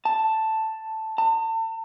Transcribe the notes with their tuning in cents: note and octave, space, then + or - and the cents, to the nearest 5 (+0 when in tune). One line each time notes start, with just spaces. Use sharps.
A5 +5
A5 +35